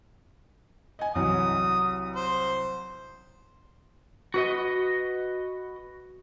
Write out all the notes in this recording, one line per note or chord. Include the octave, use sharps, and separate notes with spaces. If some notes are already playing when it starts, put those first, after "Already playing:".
D#5 G#5
C2 E3 F#3 D#6
C5
F#4 B4 D#5